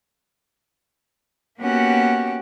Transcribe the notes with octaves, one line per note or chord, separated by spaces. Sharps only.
A#3 B3 C#4 F#4 G4 F#5